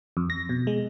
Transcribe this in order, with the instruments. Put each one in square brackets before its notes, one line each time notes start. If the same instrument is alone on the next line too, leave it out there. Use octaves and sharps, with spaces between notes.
[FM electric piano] F2
A#6
B2
G#3